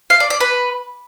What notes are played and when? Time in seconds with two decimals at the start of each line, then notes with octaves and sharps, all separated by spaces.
0.10 F5
0.20 D5
0.30 D5
0.40 B4